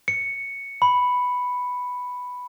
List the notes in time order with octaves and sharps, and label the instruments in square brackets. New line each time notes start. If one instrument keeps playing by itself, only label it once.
[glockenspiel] C#7
B5